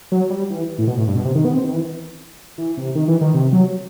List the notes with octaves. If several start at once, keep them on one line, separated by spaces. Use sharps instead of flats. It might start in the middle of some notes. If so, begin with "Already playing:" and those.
F#3
G3
E3
A2
B2
A2
G2
B2
C3
D#3
B3
C4
D#3
E3
E3
C3
D#3
E3
D#3
C3
F#3